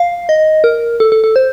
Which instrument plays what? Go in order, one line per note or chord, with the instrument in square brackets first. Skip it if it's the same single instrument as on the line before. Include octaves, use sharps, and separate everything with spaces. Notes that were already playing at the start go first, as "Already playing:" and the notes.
Already playing: [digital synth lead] F5
D#5
A#4
A4
A4
A4
C5